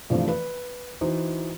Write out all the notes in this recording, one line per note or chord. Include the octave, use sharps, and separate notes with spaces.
G2 C3 E3 F3 A3
B4
E3 D#4 F#4 C5